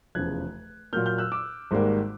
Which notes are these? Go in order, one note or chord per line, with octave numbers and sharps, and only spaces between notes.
F1 E2 C#3 F3 F#6 G#6
A#2 F#3 A#3 F6 G6
F6 G6
E6 F#6
D6 E6
G#1 G#2 D#3 G3 A#3